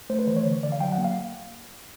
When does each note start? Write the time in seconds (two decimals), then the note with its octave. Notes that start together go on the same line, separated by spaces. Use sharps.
0.10 A3 C5
0.19 B4
0.27 E3 C5
0.36 C#5
0.45 D3
0.63 D3 D5
0.72 F5
0.80 F#3 G5
0.92 F#5
0.98 A#3
1.04 F5